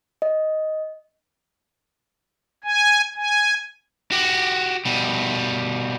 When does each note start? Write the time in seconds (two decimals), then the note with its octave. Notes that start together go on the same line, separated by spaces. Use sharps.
0.22 D#5
2.64 G#5
3.16 G#5
4.12 F#4 G4
4.85 B2 G3